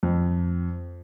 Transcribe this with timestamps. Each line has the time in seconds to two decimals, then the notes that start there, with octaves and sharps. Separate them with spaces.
0.03 F2